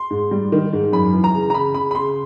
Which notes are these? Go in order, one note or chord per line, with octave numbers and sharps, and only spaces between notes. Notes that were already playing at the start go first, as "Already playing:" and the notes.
Already playing: C6
G#2
G3
D#3
G#2
F#2 B5
E3
A#5
C#3
A#5
C#3 B5
C#3 B5
B5
C#3 C6